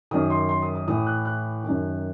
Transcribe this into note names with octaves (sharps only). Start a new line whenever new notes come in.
F#2 D#3 D#6
C6
C6
D#6
D#6
A2 E3 D#6
F#6
F#6
F#2 D#3